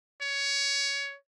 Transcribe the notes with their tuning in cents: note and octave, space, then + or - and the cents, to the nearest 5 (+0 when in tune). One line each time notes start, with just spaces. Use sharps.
C#5 +20